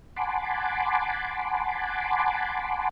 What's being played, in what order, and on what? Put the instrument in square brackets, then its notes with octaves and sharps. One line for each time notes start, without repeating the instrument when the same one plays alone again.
[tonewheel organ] F#5 G#5 A5 B5 C6 D6